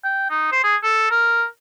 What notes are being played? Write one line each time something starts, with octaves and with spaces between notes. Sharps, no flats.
G5
D#4
C5
G#4
A4
A#4